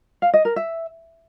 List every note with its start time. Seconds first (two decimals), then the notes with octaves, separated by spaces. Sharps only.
0.22 F5
0.33 D#5
0.45 A#4
0.56 E5